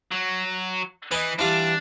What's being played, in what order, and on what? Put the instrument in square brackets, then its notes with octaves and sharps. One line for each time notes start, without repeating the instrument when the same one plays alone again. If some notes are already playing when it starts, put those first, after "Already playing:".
[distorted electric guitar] F#3
[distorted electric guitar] E3 [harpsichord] B4 D#5
[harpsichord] E3 G3 F4 [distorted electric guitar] D4